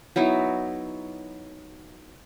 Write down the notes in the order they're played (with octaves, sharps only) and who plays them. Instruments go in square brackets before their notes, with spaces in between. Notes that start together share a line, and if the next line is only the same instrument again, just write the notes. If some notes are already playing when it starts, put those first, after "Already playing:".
[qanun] F#3 B3 D#4 E4